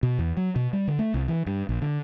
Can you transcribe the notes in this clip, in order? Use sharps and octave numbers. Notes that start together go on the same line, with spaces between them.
B2
E2
F#3
B2
G3
D3
A3
C2
E3
G2
A#1
D3